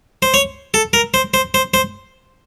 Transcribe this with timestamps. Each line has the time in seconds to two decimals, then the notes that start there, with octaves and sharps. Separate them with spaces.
0.22 C5
0.34 C#5
0.74 A4
0.93 A#4
1.14 C5
1.34 C5
1.54 C5
1.74 C5